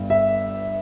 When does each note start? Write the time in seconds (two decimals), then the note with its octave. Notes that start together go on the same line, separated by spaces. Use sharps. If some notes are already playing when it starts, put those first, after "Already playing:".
Already playing: G1 G2
0.10 E5